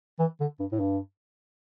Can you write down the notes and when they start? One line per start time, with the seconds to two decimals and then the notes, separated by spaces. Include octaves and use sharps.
0.19 E3
0.40 D3
0.59 G2
0.72 A2
0.80 G2